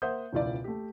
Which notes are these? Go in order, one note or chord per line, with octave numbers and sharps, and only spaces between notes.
A#3 C5 E5 F#5 D#6 G6
E1 C#2 E4 F4 D5
A3 G4